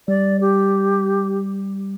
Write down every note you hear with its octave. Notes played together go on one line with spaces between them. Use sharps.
G3 D5
G4